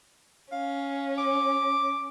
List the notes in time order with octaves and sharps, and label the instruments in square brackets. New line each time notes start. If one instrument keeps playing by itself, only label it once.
[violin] C#4 [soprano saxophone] F5
[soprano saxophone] D6